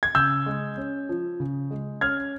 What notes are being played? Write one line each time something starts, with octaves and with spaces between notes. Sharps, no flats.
G#6
C#3 E6 G6
G#3
C#4
F3
C#3
G#3
C#4 F6 G#6